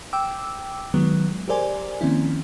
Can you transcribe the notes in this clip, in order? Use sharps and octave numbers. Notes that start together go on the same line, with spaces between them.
G5 D6 E6
D#3 F#3 G#3 B3
G4 G#4 A#4 C5 D5 G#5
D#3 F3 A#3 C4 C#4 E4